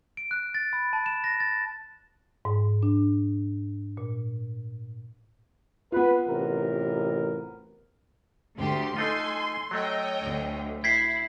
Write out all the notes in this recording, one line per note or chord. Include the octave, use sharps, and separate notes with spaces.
D7
F#6
A6
B5
A5
E7
A#6
A6
G#2
D4
A#2
B3 F4 B4
A1 C3 A#4
D2 G4 C6
A3 D#4 F4 A4 G#5 C6
F#3 A3 C#5 D#5 G5
D2
E4 G5 G#6 B6 C7